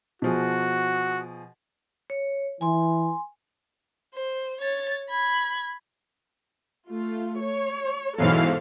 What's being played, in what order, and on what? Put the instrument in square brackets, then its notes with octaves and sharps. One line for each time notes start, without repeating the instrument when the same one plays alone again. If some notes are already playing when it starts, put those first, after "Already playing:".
[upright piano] B2 F3 G#4 [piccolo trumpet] F#4
[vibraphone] C#5
[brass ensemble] E3 [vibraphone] G#5 C6
[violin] C5
C#5 A6
B5 G#6
[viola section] A3 F4
C#5
[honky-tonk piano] G#2 B2 F#3 [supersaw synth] E3 F5 [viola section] A4 C5